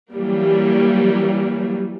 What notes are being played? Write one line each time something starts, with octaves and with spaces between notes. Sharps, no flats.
E3 F#3 G3 A#3